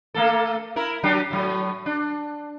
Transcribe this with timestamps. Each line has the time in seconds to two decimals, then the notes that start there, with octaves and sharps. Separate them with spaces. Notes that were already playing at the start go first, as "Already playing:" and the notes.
0.14 A3 A#3 A4
0.76 E4 A#4
1.03 F#3 D4 G4
1.31 A2 F#3
1.86 D4